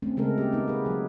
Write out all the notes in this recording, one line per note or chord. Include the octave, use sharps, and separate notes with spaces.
A3 C4 C#4
C#3 G#3 A3 A4 A#4
A#3 G4
B3 D#4
G#4 B4
F#3 G#4